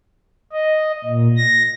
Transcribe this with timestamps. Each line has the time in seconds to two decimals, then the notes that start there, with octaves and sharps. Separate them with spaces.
0.52 D#5
1.04 A#2
1.37 A#6